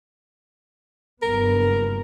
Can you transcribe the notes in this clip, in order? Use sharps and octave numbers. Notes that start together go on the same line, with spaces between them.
F#1 G2 B3 A#4